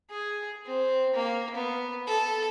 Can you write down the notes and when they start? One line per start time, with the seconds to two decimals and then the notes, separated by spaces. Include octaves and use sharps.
0.10 G#4
0.66 C4
1.14 A#3
1.55 B3
2.07 A4